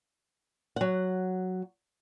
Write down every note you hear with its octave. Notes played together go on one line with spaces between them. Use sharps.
F#3 F#5